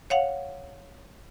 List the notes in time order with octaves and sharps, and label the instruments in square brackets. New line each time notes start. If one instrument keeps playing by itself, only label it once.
[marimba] C#5 F5 F#5